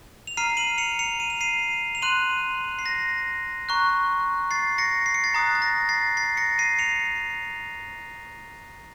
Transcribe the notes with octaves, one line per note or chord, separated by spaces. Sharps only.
F7
A#5 F6 C7 D#7
D#7 F#7
C#7 F7
C#7 F7
D#7
F7
C7 D#7
F7
C6 F#6 D#7 F#7
C7
A#6
A#5 C#6 F#6
A6 C7
A#6 C#7
C7
C#7
A6 C7
A#5 D#6 F#6 A6
A6
A#6
A6 C7
A6 C7
A#6 C#7
C7 D#7
C#7 F7